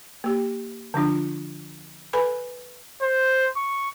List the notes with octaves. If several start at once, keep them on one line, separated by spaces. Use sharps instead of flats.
A#3 G4
D3 F3 D4 F4
A4 B4 G#5 B5
C5
C#6